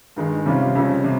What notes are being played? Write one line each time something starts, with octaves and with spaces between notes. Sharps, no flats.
G2 D#3 G#3
C3 G3 C#4 F4
F2 C#3 G3 C#4
C3